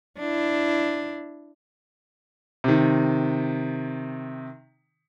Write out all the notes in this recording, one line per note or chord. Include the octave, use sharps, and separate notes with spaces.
D4 E4
C3 D#3